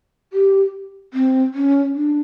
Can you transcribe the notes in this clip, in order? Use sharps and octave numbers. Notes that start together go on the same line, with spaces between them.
G4
C4
C#4
D4